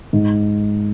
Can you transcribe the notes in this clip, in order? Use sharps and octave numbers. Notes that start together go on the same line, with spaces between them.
G#2